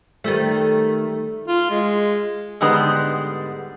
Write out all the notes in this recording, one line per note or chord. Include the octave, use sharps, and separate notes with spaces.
D#3 G3 A3
F4
G#3
G#2 D3 G3 G#3 B3